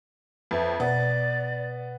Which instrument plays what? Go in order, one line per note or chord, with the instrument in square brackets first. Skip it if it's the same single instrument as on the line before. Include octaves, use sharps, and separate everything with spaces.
[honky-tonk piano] F2 [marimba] B4 E5
[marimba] B2 [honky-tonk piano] B3 [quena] D5